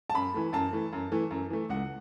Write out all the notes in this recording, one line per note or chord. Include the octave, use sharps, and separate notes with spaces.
A5
F#2 B5
E3 A3
F#2 A5
E3 A3
F#2
E3 A3
F#2
E3 A3
C#2 F#5